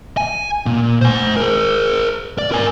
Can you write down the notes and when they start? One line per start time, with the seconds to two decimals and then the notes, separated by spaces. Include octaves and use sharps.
0.17 G#5
0.66 A#2
1.01 C5 G#5
1.37 G#4 A#4
2.39 D5
2.52 A#4 G#5